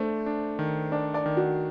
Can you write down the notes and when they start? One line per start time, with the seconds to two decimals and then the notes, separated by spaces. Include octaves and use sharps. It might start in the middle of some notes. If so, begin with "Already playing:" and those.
Already playing: A3 D4 C5
0.26 D4
0.59 D#3
0.92 D4 D5
1.14 D5
1.26 D#3
1.37 F#4